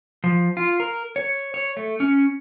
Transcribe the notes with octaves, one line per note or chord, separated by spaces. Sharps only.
F3
F4
A#4
C#5
C#5
A3
C#4